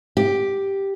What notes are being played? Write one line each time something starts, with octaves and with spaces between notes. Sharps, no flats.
G4